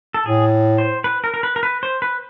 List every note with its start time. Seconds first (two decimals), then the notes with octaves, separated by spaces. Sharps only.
0.14 A4
0.26 A2 G#4
0.78 C5
1.04 B4
1.24 A#4
1.34 A#4
1.43 B4
1.56 A#4
1.63 B4
1.83 C5
2.02 B4